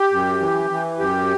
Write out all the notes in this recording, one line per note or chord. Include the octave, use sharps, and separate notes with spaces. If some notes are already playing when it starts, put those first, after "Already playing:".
Already playing: G4
F#2
E3
E3
F#2 G4